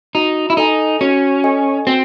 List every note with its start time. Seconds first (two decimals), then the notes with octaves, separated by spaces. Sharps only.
0.15 D#4 F#4
0.50 E4
0.57 D#4 A4 D#5 G#5
1.01 C#4 F#4
1.44 A4 D#5 G#5
1.86 C4 F#4